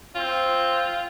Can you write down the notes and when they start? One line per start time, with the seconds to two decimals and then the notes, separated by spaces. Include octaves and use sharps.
0.15 C4 F4